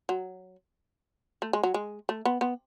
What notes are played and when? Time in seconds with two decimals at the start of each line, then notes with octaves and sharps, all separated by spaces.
0.09 F#3
1.42 A3
1.53 G#3
1.63 F#3
1.74 G#3
2.09 A3
2.25 B3
2.41 B3